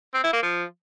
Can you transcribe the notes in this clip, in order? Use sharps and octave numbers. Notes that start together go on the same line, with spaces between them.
C4
E4
A#3
F3